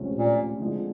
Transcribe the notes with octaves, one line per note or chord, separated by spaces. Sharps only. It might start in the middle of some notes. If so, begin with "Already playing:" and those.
Already playing: D2 C3 F3 G#3 C#4
A#2
D3 F3 G#3 C4 F4